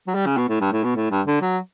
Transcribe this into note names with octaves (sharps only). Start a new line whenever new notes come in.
F#3
G3
C#3
B2
A2
G2
A2
B2
A2
G2
D3
F#3